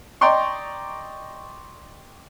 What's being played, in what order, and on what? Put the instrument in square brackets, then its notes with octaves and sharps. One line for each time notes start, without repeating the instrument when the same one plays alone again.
[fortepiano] D5 D#5 G5 A#5 C6 C#6